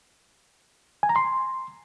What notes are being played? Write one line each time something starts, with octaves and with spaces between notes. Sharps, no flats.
G#5
A#5
C6